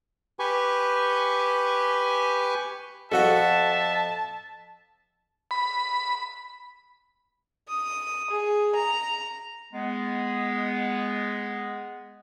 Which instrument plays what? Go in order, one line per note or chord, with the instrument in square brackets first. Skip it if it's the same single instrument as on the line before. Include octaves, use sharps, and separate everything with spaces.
[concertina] G4 B4 G#5 C#6
[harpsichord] F2 F3 F#5 [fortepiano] F#4 A4 [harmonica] E5 [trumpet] A5
[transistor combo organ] B5
[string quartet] D#6
G#4
A#5
[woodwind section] G#3 B3